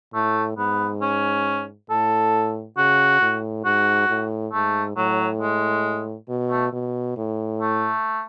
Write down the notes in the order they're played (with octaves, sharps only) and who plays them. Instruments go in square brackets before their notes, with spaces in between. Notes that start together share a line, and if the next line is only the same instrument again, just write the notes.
[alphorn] A2 [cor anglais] A3
[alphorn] G#2 [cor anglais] B3
[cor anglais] C#4
[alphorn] A2 [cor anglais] A4
[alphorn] C#3 [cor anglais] F#4
[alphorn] A2
[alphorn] G#2 [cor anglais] F#4
[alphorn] A2
[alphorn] G#2 [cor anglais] A3
[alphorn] A2 [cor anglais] F#3
[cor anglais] G#3
[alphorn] B2
[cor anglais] A3
[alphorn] B2
A2
[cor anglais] A3